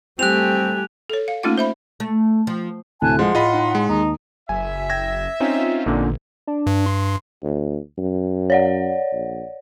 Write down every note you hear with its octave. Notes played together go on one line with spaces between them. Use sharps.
G3 A3 C4 G4 G#5 F#6 F7
A4 C#5
F5
A3 A#3 C#4 D#4 F4 F#5
C5 E5 B5
A3
F3
D2 A2 C3 G#5 A5 F#6
F3 G#3 G#4 F#5 C6
A2 F4 D#5 B5
D#4
G#3
D#2 D#4
F#1 E5 G#5
G5 G#6 A#6
C4 C#4 D#4 F4
A1 A#2 D3
D4
G2
C6
D2
F#2
C#5 D5 F#5
A#1